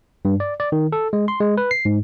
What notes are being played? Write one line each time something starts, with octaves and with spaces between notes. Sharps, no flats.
G2
D5
D5
D#3
A4
G#3
C6
G#3
B4
C7
G#2